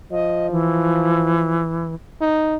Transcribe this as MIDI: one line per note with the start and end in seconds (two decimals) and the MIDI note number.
0.11 1.63 53
0.11 0.50 75
0.52 1.95 52
2.21 2.56 63